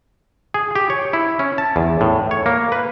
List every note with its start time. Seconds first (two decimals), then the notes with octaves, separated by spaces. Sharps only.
0.54 G#4
0.75 G4
0.90 C#5
1.13 E4
1.39 C#4
1.58 A5
1.76 E2
2.01 A2
2.31 C#5
2.46 A#3
2.72 B4